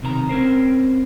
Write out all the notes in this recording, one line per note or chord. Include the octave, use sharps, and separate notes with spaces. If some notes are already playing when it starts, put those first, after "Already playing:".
B1 C3 D#3 B4 A#5
C4 C#4 A#4 C5